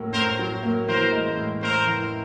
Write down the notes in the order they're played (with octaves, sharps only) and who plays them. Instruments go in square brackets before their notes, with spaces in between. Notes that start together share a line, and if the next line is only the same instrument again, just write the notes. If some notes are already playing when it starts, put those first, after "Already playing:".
Already playing: [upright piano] A2 F#3 A#3
[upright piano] A2 [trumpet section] A#4 C5
[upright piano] F#3
A#3
[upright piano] E3 [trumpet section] A#4 C5
[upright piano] G#3
A2
[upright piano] A2 [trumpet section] A#4 C5
[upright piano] E3